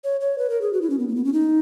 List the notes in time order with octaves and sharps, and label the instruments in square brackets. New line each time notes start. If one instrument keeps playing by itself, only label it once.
[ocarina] C#5
C#5
B4
A#4
G#4
F#4
E4
C#4
B3
A#3
B3
C#4
D#4